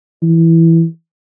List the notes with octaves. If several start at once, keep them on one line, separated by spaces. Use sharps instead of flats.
E3